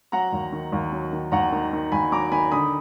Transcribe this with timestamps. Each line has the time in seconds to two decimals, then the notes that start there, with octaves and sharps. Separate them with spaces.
0.12 F#3 F#5 A#5
0.32 D#2
0.53 D#3
0.72 D#2
0.93 F#3
1.13 D#3
1.32 D#2 F#5 A#5
1.52 D#3
1.73 D#3
1.92 D#2 G#5 B5
2.12 F#3 A#5 D6
2.32 D#3 G#5 B5
2.51 D3 B5 D#6